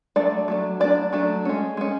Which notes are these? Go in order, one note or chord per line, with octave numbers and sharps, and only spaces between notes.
F#3 A3 D4 D5
F#3 A3 D4
F#3 A3 D4 D5
F#3 A3 D4
G#3 C#4
G#3 C#4